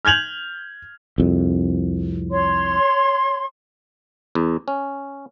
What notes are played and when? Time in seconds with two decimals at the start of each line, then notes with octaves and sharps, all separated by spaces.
0.05 F6 G6 G#6 F7 F#7
1.18 C2 F2
2.31 C#5 C6
4.35 E2
4.68 C#4